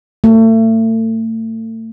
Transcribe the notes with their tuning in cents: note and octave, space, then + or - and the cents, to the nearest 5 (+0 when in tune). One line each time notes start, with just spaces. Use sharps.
A3 +35